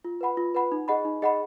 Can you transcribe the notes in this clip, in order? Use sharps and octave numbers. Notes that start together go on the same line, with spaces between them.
F4
B4 F#5 B5
F4
B4 F#5 B5
D#4
G#4 D#5 F#5 B5
D#4
G#4 D#5 F#5 B5